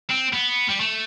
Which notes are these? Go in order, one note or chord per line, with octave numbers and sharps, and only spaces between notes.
C4
B3
G3
A3